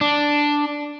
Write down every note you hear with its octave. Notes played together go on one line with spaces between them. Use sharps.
D4